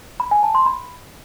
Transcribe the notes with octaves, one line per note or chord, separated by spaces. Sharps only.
B5
G#5
A5
C6
B5